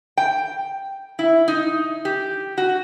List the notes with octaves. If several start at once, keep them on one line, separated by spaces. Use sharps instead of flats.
G5
E4
D#4
G4
F#4